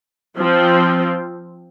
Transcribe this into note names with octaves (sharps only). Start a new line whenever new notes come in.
F3 C4